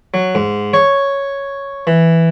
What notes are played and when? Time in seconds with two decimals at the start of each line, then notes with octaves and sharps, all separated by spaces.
0.14 F#3
0.35 G#2
0.74 C#5
1.87 E3